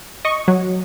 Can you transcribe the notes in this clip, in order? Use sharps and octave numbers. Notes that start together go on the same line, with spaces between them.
D#5 C#6
F#3